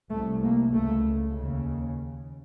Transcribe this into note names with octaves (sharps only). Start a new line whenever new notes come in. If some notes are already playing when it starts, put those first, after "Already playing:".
C2 C3 A3
A#3
C#2 C#3 A3
D#2 C#3